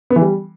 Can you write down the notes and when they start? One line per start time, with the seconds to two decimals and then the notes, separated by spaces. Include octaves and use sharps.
0.10 B3
0.16 E3
0.21 G3